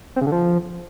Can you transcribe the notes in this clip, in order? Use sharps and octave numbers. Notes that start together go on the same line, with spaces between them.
C4
C#3
D3
F3